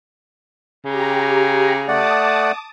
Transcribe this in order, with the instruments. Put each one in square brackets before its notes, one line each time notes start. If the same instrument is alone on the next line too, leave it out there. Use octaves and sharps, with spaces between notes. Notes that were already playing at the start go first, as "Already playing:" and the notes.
[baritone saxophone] C#3 [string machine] G4 A#5
[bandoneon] A3 D5 F#5 [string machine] A5 D6 D#6